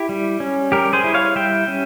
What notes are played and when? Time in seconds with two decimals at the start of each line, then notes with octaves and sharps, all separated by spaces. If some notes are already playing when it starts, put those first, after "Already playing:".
Already playing: E4 G4
0.09 G3
0.40 C#4
0.72 G3 G4 A#4
0.93 G#4 C5
1.04 E4
1.14 C#5 F5
1.36 G3 E5 G5
1.68 C#4